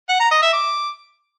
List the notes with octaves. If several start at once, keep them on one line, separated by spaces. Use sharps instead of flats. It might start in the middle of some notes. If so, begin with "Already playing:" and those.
F#5
A#5
D#5
E5
D6